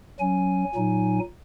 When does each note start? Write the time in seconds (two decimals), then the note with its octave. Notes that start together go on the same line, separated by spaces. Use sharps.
0.20 F#3 C#4 G#5
0.75 A#2 F#3 D#4